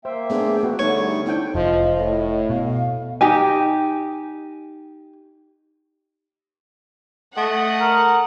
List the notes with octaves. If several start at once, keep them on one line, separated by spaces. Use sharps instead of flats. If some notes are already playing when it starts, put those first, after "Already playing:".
A#3 C5 E5 G5
A3 B3 D4 G#4
B3 F#4
D3 G3 A3 D#4 C#5
E2 C4 D4 E4 G5
F1 F3 D#5
A2 D#5
B2 F5
D#4 G4 G#5
A3 D#5 F#5
A#4